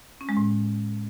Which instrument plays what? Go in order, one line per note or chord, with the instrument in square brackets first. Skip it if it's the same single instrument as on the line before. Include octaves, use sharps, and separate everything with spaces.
[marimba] C#4
G#3
A2